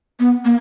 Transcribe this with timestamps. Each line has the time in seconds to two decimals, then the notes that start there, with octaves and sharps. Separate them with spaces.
0.20 B3
0.45 A#3